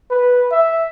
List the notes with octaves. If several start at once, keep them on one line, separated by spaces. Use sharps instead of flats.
B4
E5